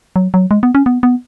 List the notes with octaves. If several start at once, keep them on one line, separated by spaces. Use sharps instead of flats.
F#3
F#3
G#3
B3
C#4
B3
B3